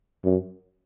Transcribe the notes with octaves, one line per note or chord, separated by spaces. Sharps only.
F#2